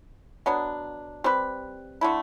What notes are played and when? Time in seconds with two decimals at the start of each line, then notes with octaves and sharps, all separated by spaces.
0.46 B2 F#3 B3 D4
1.24 G3 C4 G4 B4
2.01 D3 A3 E4